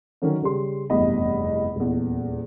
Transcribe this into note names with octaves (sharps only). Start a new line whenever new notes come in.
D3 D#3 F#3 C#4 A#4
C#3 G3 C6
F1 E2 G2 D#5 B5
D#1 E2